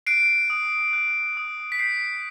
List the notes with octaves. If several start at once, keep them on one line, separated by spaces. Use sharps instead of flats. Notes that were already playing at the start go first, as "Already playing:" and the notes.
F#6 C7 D7
D#6
F#6
D#6
B6
G6 C7